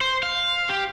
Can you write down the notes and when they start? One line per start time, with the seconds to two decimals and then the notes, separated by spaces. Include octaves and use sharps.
0.01 C5
0.23 F5
0.69 G4